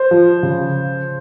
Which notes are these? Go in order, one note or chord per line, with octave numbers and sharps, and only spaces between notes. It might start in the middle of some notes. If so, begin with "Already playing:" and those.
Already playing: C5
F3
C#3